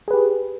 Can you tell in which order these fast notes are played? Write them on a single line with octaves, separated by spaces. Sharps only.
G#4 B4 G4